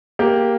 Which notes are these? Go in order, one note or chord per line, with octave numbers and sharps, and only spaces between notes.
A#3 G4